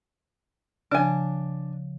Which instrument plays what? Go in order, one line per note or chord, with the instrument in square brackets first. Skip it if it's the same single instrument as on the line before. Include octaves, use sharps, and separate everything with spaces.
[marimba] C#3 F3 [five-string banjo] D4 G#5